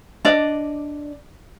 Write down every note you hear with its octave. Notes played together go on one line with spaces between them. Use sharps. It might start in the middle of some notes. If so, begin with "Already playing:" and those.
D4 D5 D#5